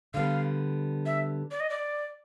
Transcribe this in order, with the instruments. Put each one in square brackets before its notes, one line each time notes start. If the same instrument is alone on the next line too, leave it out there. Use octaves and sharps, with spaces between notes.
[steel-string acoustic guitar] D3 G3 B3 [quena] F5
[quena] E5
D5
D#5
D5